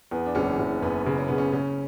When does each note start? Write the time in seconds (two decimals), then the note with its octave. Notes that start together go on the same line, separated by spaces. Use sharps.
0.11 E2 B3
0.26 D4
0.35 F#1 C#4
0.59 F#1
0.82 F#2 B3
1.06 C#3
1.18 C#4
1.28 C#3 B3
1.38 C#4
1.53 C#3 C#4